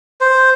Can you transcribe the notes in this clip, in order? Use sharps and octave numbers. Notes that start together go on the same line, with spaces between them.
C5